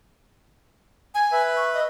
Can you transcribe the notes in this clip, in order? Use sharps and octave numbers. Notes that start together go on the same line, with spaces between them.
G#5
B4 E5
C#6
D#5